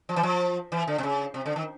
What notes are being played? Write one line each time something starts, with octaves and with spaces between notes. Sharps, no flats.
F3
E3
F3
E3
D3
C3
C#3
C3
D3
D#3